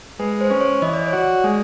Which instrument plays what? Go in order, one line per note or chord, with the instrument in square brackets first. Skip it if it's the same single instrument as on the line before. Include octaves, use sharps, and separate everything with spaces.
[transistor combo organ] G#3 [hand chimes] B4
[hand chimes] C5
[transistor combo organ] C#4
[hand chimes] C#5
[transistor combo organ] E3 [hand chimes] D#5
[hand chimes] D5
C#5
[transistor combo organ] F#4
[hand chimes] D5
[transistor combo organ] G#3